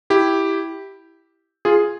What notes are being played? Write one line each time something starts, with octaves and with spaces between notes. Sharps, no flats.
E4 G4
F4 G#4